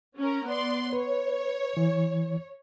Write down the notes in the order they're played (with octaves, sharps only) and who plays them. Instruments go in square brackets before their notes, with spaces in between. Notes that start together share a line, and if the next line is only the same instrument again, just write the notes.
[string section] C#4 A#4
B3 D5 C6
[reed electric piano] B4 [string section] C#5
[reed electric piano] E3